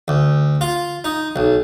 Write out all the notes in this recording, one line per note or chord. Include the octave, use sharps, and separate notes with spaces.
D2
F4
D#4
B1